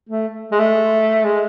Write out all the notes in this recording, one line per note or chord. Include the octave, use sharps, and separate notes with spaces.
A3
G#3
A3
G#3